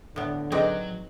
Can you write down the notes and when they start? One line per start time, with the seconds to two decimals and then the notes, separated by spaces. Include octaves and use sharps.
0.16 A2 D3 B3
0.52 F#3 C4 D#4 G#4 B4 D5 D#5